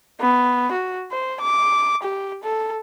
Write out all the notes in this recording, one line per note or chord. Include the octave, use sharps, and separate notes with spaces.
B3
F#4
C5
D6
G4
A4